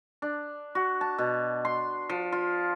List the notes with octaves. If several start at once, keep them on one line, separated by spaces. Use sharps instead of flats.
D4
F#4
A5
B2
C6
F3
F4